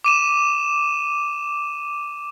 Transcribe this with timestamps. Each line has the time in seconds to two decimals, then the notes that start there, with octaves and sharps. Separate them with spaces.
0.04 D6 D#7 E7